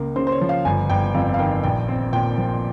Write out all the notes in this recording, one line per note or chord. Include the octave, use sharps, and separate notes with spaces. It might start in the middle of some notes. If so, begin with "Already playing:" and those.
Already playing: C#2 A#3
C#3 C5
C5
C#5
F3
F5
G1 G#5
G1 G5
F2 F5
F5
D#3 G5
A#1 G5
C4
A#2 G5
F3